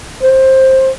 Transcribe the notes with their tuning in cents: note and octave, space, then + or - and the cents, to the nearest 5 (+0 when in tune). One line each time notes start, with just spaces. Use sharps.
C5 +15